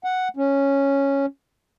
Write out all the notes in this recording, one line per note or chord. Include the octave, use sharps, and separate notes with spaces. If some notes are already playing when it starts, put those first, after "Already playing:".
F#5
C#4